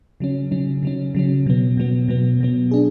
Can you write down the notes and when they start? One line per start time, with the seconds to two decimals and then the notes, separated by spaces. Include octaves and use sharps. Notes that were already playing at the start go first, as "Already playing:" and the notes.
0.20 C#3 F#3 C#4
0.51 C#3 F#3 C#4
0.83 C#3 F#3 C#4
1.15 C#3 F#3 C#4
1.46 B2 F#3 B3
1.77 B2 F#3 B3
2.08 B2 F#3 B3
2.40 B2 F#3 B3
2.71 D4 G#4